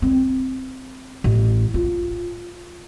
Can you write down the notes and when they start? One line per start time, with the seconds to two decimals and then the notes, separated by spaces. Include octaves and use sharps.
0.02 C4
1.24 A1
1.74 F4